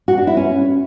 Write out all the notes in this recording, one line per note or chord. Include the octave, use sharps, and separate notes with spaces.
F#4
D4
E4
C#4